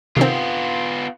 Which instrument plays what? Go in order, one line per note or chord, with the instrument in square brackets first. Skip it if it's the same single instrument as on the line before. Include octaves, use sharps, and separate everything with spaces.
[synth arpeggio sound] C3 D#3 C4 [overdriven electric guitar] B3 F4